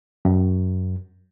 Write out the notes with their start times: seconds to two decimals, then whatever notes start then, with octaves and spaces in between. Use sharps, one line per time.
0.25 F#2